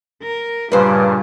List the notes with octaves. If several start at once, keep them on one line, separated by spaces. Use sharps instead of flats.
A#4
G2 A#2 C#3 G3 B4 C5